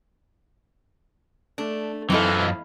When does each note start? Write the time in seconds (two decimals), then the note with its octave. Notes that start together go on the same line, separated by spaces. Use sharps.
1.58 A3 D4
2.10 F#2 E3 C4 D#4 E4 A4 D#5 F5